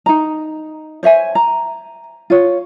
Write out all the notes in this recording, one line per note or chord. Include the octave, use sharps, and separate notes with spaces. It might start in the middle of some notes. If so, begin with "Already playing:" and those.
D#4 A#5
C5 C#5 E5 G#5
A#5
F4 C#5